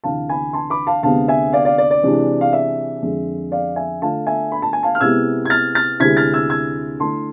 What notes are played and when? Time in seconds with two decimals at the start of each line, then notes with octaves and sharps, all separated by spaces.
0.04 D2 C3 E3 F5 A5
0.29 G#5 B5
0.53 A5 C6
0.70 B5 D6
0.87 F5 A5
1.03 D2 C3 G#3 B3 F5 A5
1.28 E5 G#5
1.53 D5 F5
1.65 D5 F5
1.78 D5
1.91 D5
2.03 C3 E3 G#3 D4
2.41 F5
2.53 E5
3.02 F2 D3 G#3
3.52 D5 F5
3.76 E5 G#5
4.02 D3 A3 D4 F4 F5 A5
4.27 E5 G#5
4.52 B5
4.62 A5
4.73 G#5
4.83 F5 A5
4.95 F6
5.00 C3 G#3 B3 E4 E6 G#6
5.45 G#6
5.50 F6 A6
5.75 F6 A6
6.00 D2 C3 G#3 C4 E4 G#6 B6
6.17 F6 A6
6.34 E6 G#6
6.50 E6 G#6
7.00 D3 A3 E4 A5 C6